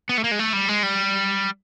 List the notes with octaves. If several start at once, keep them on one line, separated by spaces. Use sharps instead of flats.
B3
A3
A#3
G#3
A3
G3
G#3
G3